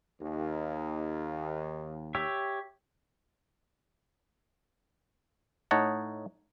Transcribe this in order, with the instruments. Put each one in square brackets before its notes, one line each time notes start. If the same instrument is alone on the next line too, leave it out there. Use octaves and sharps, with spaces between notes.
[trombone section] D#2
[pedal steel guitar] G4 C#5 E5
[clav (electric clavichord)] A2 D#4 C#5 D#5 F#5 A5